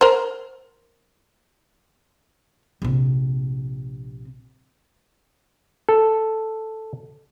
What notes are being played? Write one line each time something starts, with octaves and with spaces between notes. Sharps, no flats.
A#4 C5
A#1 C3
A4